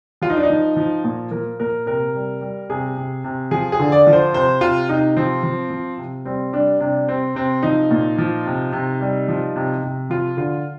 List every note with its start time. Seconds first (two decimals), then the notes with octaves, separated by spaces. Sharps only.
0.22 F3 F4
0.30 D#4
0.37 D4
0.43 D#4
0.50 F3
0.77 F3
1.04 A#2
1.31 F3 A#4
1.60 A#2 A#4
1.86 C3 A#4
2.15 G3
2.41 G3
2.70 C3 G#4
2.97 C3
3.24 C3
3.51 F3 G#4
3.72 G#4
3.79 D3
3.92 D5
4.07 F3
4.13 C5
4.33 C3 C5
4.61 C3 F4
4.89 C3 D#4
5.17 F3 C4
5.43 F3
5.70 F3
5.98 C3
6.25 G3 C4
6.53 G3 D4
6.80 C3 D4
7.08 C3 C4
7.35 C3 C4
7.63 F3 D#4
7.91 A#2
8.18 F3
8.46 C3
8.73 C3
9.01 G3
9.28 F3
9.56 C3
9.83 C3
10.10 F3 F4
10.37 D3 F4